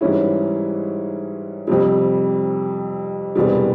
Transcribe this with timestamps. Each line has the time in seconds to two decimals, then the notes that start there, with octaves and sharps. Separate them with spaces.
0.01 G#2 E3 G3 C#4 E4
1.68 F2 C3 G3
3.36 E1 E2 C3 G3